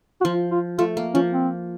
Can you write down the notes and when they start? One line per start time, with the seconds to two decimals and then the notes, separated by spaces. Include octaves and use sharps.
0.21 F#4
0.25 F3 F4
0.51 F4
0.79 A3 F4
0.97 A#3
1.14 F3 C#4
1.33 C4